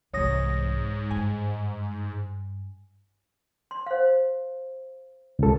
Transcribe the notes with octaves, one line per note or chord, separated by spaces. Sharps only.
C2 G#2 E3 C#5 D#6 A#6
G2 G#5
C6
C5 F5
C#2 A4